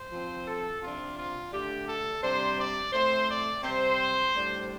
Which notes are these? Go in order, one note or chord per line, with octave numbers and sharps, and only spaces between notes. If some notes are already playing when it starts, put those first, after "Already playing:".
Already playing: C5
F3 C4
A4
C3 F3 D4 F4
F4
D3 A3 D4 G4
A4
C3 G3 D4 C5
D5
A2 A3 C4 C5
D5
C3 G3 C4 C5
A2 G3 D4